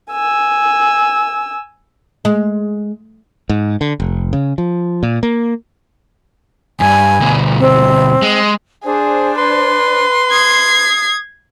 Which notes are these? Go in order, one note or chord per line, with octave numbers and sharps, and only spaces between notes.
G#5 E6
G#3
G#2
D3
F1
C#3
F3
A#2
A#3
E2 G2 G#5
D2 B2
C4
G#3
D4 G#4 C5
B4 C6
D#6 G#6 C7